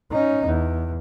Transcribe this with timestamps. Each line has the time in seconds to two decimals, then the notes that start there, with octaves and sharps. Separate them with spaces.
0.11 C#4 D#4
0.47 E2